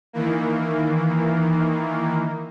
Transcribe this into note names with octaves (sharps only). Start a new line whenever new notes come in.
D#3 E3 A#3